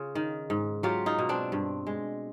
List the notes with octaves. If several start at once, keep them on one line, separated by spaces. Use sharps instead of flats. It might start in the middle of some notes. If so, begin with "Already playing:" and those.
Already playing: C#3 F4
D#3
G#2
F#3 F4 G4
D#4 F4
B2
C4 D4
G2
G#3